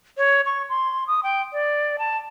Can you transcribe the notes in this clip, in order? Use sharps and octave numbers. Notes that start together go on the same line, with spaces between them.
C#5
C#6
C6
D#6
G5
D5
A5